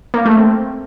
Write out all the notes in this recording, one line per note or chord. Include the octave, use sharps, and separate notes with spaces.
A#3
A3
C4